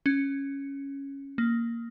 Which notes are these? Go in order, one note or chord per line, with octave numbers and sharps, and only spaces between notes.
C#4
A#3